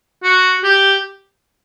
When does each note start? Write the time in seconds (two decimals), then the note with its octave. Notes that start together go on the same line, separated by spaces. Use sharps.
0.23 F#4
0.64 G4